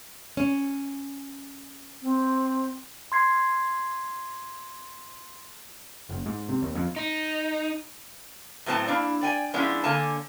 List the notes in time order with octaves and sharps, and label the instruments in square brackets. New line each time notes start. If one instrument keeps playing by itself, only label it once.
[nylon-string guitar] C#4
[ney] C4
[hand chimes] C6 G#6 C7
[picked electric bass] F#1
G#2
C3
D#2
F2
[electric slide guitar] D#4
[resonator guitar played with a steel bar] A2 F#3 B3 C4 A5
A#3 D4 E4
D5 G5 G#5
F3 G#3 B3 C#4 D4 E4
D3 A#3 C#5 G#5 A5